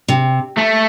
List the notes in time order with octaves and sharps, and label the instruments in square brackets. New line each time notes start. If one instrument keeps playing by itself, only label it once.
[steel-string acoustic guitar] C3
[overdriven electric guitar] A3